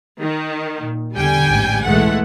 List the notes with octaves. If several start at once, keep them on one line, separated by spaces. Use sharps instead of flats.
D#3
A#2
E2 D3 G3 G5 G#5
A1 G#2
C#2 B2 E3 G#3 A3 F#5